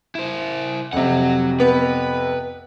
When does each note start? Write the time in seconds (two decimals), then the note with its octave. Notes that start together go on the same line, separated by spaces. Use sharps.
0.15 E4 C5
0.93 F2 C3 F#3 F#5
1.60 B3 B4